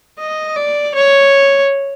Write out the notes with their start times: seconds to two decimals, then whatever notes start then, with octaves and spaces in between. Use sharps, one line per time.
0.18 D#5
0.56 D5
0.94 C#5